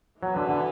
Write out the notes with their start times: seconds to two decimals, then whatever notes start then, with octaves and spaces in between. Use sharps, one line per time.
0.22 E3 F#3 B3 F#4 B4
0.36 D3
0.49 D3